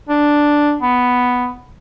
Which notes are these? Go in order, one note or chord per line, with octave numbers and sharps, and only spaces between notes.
D4
B3